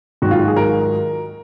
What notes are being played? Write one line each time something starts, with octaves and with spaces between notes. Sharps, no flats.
G#2 D#3 F#3 F#4
F4
F#4
G#4
A#4